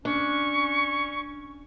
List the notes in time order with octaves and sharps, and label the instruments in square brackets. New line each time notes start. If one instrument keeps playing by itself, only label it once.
[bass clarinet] C#4 [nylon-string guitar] D4 [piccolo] C#6